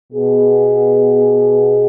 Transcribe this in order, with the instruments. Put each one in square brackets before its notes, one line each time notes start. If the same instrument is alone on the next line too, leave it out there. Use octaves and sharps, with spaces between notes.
[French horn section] B2 B3 G#4